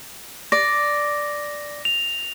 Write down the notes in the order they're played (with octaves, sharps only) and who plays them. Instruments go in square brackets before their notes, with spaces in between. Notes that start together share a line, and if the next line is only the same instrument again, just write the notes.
[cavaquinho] D5 [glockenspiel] A#6
[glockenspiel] F7